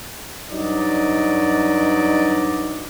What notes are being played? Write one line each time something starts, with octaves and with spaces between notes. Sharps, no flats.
G2 F#3 D#4 D5 D#5